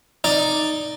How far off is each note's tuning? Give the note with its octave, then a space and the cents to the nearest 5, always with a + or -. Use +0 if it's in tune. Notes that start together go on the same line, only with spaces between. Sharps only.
D#4 -5 D5 +5